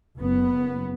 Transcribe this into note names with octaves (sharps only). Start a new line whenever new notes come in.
F#1 B3